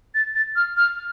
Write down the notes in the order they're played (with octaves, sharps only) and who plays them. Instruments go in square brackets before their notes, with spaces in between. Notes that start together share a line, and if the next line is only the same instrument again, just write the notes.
[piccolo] A6
A6
F6
F6